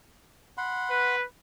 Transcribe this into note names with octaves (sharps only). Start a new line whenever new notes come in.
F#5 B5 C6
B4